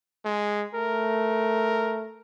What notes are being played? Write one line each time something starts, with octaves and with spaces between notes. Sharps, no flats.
G#3
A3 A#4